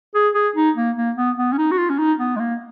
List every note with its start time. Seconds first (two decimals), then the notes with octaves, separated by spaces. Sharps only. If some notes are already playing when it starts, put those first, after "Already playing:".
0.15 G#4
0.34 G#4
0.56 D#4
0.76 A#3
0.97 A#3
1.16 B3
1.38 B3
1.53 C#4
1.58 D#4
1.71 F#4
1.78 F4
1.90 C#4
1.99 D#4
2.19 B3
2.36 G#3
2.40 A#3